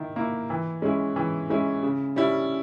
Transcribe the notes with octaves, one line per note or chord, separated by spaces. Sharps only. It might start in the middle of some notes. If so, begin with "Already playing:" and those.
Already playing: D#3 E4
A#3 E4
E3
G#3 C#4 E4
E3
G#3 C#4 E4
C#3
G3 C#4 E4